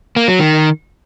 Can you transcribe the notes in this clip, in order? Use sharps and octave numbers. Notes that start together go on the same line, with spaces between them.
A#3
F#3
D#3